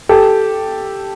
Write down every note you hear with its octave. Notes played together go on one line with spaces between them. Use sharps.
G4 A4